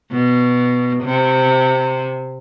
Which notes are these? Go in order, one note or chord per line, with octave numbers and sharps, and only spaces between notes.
B2
C3